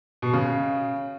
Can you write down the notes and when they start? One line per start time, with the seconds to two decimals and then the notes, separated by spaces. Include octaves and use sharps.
0.22 B2
0.33 C#3